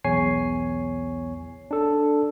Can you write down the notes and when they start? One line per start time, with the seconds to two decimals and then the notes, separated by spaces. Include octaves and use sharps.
0.04 B1 E2 C#5 G#5 C7
1.71 D4 A4